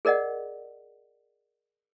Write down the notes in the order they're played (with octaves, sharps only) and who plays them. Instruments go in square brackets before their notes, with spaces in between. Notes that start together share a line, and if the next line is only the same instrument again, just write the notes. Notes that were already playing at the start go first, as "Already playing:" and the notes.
[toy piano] G#4 A#4 D5 D#5 F#5